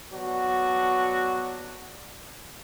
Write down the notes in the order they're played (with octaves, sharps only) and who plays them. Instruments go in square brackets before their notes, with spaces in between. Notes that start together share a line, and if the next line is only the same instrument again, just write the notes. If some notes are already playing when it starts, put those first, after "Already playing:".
[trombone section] F#3 B3 D4 F#4